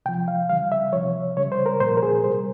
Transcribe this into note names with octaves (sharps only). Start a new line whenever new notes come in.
C3 F3 G5
F5
C#3 E3 G3 F5
E5
C3 F3 C#5
C#3 G3 C#5
C5
A#4
A#2 F3 C5
A#4
G#4
C3 G3 C5